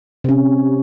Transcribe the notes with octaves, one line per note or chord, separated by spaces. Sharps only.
C3 C#4